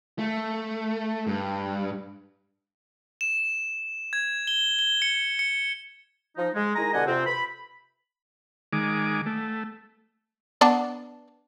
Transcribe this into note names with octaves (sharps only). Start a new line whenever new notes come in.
A3
G2
E7
G#6
G7
G7
C#7
C#7
F3 D#4
G#3
D#3 G#3 E4 G#5 A#5
B2 D3 G4 D#5 F#5 G#5
F2 C3 C4
B5
D#3 G#3 D6
A3
B3 D4 A5